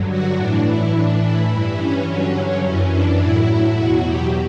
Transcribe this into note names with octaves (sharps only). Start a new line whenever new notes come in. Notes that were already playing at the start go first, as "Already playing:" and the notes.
Already playing: G2 D3 F#3
F#4
A2 E3 D4
E4
A2 E3 D4
E4
G2 E3
C#4
G2 D3 F#3 C#4
F#2 E3
D4
A2 F#3 E4
E2 B2 F#3 F#4
G4